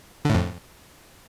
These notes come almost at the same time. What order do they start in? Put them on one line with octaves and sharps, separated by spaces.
D3 A2 F2